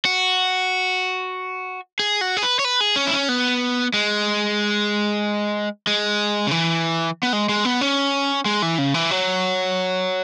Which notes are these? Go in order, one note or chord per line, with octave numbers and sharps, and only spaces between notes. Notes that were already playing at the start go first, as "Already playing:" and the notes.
F#4
G#4
F#4
G#4
B4
C#5
B4
G#4
C#4
E4
C#4
B3
G#3
G#3
C#3
E3
B3
G#3
G#3
B3
C#4
G#3
E3
C#3
E3
F#3